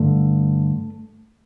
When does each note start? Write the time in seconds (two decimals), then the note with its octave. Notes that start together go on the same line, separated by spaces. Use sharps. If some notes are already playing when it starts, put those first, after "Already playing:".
Already playing: G2 D3 A3